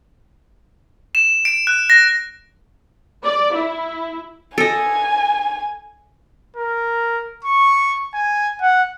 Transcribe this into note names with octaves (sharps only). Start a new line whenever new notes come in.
E7
D7
F#6
A#6
D5
E4
A4 D#5 G#5
A#4
C#6
G#5
F#5